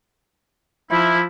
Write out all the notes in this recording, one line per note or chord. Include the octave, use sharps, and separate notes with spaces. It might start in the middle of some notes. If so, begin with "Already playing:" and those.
F3 E4